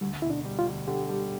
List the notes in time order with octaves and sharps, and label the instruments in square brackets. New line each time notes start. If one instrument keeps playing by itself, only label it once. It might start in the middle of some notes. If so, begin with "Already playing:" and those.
[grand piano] D2 [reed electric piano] G3
[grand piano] E1 [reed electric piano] E4
[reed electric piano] D4
[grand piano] G3
[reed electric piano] F4
[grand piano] D2
[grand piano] D3 [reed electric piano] G4
[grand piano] G3